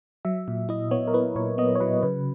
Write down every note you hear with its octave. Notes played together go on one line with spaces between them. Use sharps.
F#3 E5
A#2
E4 D#5
B3 C#5
A#4
E4 B4
A#2 C#5
B3 D#5
C#5
F#3 B4
C#3 B4